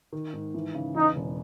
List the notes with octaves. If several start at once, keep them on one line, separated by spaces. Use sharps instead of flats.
D#3
G#2
E3
C#3
E2 D#4
E1